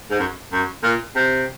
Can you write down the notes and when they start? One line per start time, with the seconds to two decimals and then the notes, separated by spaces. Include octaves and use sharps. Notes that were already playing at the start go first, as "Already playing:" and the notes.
0.10 G#2
0.20 F#2
0.52 F#2
0.83 A#2
1.15 C3